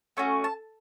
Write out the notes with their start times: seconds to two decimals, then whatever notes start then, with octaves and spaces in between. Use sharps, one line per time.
0.17 A3 C#4 F#4
0.44 A5